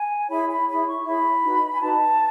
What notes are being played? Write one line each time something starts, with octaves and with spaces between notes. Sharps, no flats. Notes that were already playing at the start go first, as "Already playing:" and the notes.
Already playing: G#5
E4 G#4 C#5 B5
B5
E4 G#4 C#5 B5
C#6
E4 G#4 C#5 B5
D#4 F#4 B4
G#5
D#4 F#4 B4 A5